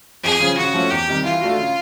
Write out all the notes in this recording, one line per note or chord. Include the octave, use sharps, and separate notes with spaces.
F2 G#4
C#3 F3
C#3 F#4
F3 A3 C#4
E2 G4
C3 D#3 G3
E3 F4
A3 D4 F#4
C#3